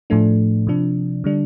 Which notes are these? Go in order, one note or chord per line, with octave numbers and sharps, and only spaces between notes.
A2 F3 A3 D4
C3 F3 D4
D3 G3 D4